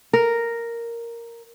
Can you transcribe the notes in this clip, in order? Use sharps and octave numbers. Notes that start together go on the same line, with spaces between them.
A#4